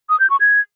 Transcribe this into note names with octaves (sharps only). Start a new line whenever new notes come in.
D#6
G6
C#6
G#6